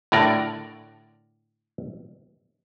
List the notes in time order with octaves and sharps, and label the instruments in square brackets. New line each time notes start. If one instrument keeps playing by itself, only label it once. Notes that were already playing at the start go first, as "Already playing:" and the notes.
[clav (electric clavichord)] A2 D3 A#4 D5